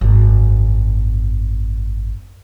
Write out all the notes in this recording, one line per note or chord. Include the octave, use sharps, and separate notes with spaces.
G#1 F#2